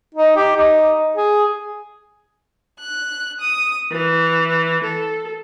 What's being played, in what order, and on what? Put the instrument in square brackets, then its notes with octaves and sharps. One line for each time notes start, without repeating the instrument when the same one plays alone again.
[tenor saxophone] D#4
G4
D#4
G#4
[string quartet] F#6
D#6
E3
A4